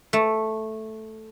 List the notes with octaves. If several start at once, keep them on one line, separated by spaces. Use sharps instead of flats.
A3